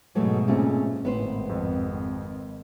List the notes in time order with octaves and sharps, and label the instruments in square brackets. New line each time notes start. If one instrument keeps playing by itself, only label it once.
[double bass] G#2 B2 [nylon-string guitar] E3 F#3 A3
[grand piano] A#2 C#3 [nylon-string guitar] A3 C4 C#4
[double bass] G#1 [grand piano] A2 [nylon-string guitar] B3 B4 C5
[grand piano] F2